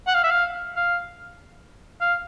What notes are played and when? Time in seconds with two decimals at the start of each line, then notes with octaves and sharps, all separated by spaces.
0.07 F#5
0.14 F5
0.24 E5
0.31 F5
0.76 F5
2.01 F5